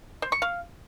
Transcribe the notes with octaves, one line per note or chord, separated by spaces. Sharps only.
C5
C#6
F5